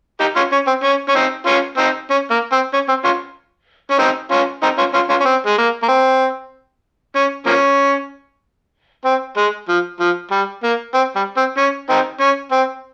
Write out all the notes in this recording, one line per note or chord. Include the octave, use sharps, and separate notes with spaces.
D#4 G4
C#4 F4
C#4
C4
C#4
C#4
C4 D#4
C#4 F4
C4 D#4
C#4
A#3
C4
C#4
C4
C#4 F4
C#4
C4 D#4
C#4 F4
C4 D#4
C#4 F4
C#4 F4
C#4 F4
C#4
C4
G#3
A#3
A#3
C4
C#4
F3 A#3 C#4
C4
G#3
F3
F3
G3
A#3
C4
G3
C4
C#4
C4 D#4
C#4
C4